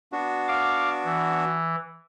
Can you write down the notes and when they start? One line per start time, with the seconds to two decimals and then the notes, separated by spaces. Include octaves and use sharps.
0.12 B3 D4 F#4
0.48 F5 D6
1.05 E3